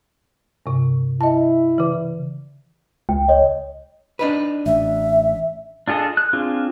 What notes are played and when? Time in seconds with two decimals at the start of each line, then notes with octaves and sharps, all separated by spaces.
0.66 G2 C3
1.21 E4 D#5 A5
1.78 C#3 E3
3.09 C#2 G5
3.28 C#5 D#5
4.19 D4 D#4 B4
4.66 A1 E5
5.88 D4 F4 G#4 A4 D#5
6.17 F#6
6.33 C4 D4 F4 G#4